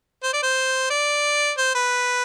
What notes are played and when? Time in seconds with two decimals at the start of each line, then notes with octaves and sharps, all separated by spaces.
0.23 C5
0.33 D5
0.43 C5
0.90 D5
1.58 C5
1.75 B4